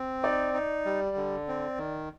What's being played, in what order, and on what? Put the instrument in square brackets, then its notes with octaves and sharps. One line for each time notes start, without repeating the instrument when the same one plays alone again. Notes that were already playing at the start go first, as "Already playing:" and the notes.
Already playing: [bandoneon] C4
[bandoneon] D#4 [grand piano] D5
[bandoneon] D#4
G3
D3
C4
D#3